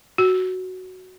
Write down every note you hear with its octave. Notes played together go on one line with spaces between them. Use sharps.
F#4